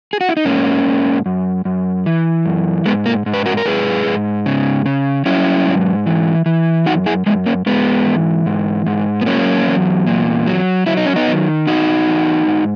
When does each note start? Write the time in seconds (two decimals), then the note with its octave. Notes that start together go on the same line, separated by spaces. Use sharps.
0.13 G#4
0.21 F#4
0.29 E4
0.37 D#4
0.45 G#2 A#3 C#4
0.86 G#2
1.26 F#2
1.65 F#2
2.06 E3
2.46 F#2
2.86 G#2 G#3 B3
3.06 A#3
3.26 G#2
3.34 B4
3.46 F#4 A#4
3.57 A#4
3.65 G#2 G#4 B4
4.06 G#2
4.46 C#3
4.86 C#3
5.26 F#3 C#4 E4
5.66 G#2
6.06 E3
6.46 E3
6.86 F#2 D#4 F#4
7.06 E4 G#4
7.26 F#2 G#3 B3
7.46 A#3 C#4
7.66 G#2 G#3 B3
8.06 E3
8.46 G#2
8.87 G#2
9.21 B3
9.26 F#3 A#3 C#4
9.67 E2
10.07 A#2
10.46 F#3
10.86 F#3 E4
10.97 D#4
11.06 C#4
11.16 B3 D#4
11.27 D#3
11.67 E2 D#4 F#4
12.07 E2
12.47 G#2